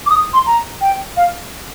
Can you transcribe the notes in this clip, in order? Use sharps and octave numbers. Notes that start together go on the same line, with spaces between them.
D6
D#6
C6
A#5
G5
F5